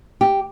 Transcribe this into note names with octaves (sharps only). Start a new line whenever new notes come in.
G4